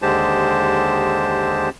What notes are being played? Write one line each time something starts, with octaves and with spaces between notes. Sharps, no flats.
D#2 D3 G#3 G4 C5 A5